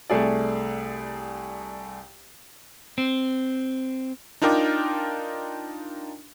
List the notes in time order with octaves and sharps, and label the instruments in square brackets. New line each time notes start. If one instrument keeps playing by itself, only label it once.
[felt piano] C2 A3 G#4 D5
[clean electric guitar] C4
[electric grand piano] D4 D#4 F4 A#4 G5 D6